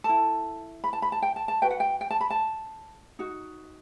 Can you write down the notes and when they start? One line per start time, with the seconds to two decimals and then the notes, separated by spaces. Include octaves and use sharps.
0.04 E4 A4 A5
0.84 B5
0.93 A5
1.02 B5
1.12 A5
1.22 G5
1.36 A5
1.48 A5
1.62 F#4 B4 G5
1.71 F#5
1.80 G5
2.01 G5
2.10 A5
2.21 B5
2.30 A5
3.19 D#4 F#4